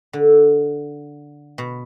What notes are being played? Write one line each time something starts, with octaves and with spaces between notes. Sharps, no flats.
D3
B2